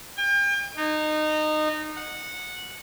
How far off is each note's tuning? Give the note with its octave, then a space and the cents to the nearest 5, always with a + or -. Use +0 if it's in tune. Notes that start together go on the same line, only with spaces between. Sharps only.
G5 +40
D#4 -20
F#5 -10